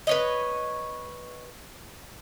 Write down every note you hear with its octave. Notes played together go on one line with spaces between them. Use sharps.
B4 C#5 D#5